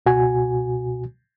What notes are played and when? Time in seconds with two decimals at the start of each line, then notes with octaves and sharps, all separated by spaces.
0.06 C#2 B2 F#4 G#5